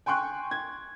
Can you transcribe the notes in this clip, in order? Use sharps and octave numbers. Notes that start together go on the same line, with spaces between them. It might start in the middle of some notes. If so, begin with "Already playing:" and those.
G5 G#5 C6 C#6 F#6 G6
G#6